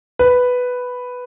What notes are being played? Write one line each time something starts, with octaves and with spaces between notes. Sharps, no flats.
B4